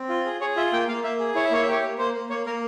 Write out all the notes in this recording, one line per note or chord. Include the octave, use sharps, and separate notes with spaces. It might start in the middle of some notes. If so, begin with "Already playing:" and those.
Already playing: C4
F4
G#4
G#4 C#5
F4 E5
A#3 G5
A#3 F5
A#3 E5
G#4
E4 C#5
E5
A#3 C#5
E5
G4 C#5
A#3
A#3 C5
A#3
A#3 C#5
A#3 A#4